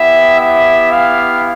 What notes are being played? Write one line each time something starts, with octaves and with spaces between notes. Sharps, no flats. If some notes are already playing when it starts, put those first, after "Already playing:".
Already playing: B3 E4 G4 E5
E5
F5